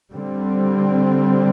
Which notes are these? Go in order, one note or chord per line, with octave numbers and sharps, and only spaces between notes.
D3 G3 C4